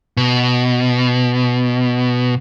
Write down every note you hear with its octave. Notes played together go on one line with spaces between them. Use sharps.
B2